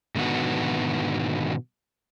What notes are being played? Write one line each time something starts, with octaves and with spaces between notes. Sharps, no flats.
G#2 B2 D3 D#3 B3 F#4